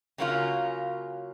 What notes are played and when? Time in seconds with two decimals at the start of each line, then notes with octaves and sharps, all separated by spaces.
0.18 C#3 F#3 A#3 C#4 F4